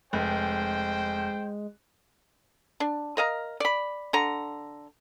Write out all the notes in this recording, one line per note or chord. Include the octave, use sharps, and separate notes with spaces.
F1 G#3 C5 G5
D4
A#4 D#5 F5 A#5
D5 B5
D3 A#5